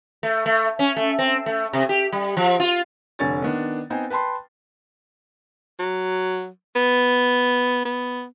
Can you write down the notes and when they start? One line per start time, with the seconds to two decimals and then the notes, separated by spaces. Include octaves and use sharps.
0.23 A3
0.46 A3
0.79 C#4
0.97 A3
1.19 C4
1.46 A3
1.73 C3
1.89 G4
2.13 G3
2.37 F3
2.60 F4
3.19 F1 D3 C#5 G#5 C#6 A6
3.42 D#3 B3 D4
3.90 B3 C4 D#4 C5 G5 G#5
4.10 B4 G5 A5 B5 C6
5.79 F#3
6.75 B3
7.85 B3